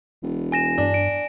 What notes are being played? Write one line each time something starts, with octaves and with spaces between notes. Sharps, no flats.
E1
G#5 A#6 E7
G2 D4
D7